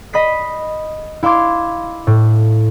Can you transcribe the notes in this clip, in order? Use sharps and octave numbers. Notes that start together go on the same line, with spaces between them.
D#5 B5 D#6 B6 C7
E4 F5 C6 D6 G#6
A2